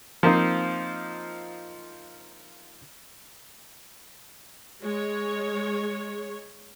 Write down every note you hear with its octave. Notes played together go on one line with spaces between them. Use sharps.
F3 A#3 C4 D#4
G#3 C#5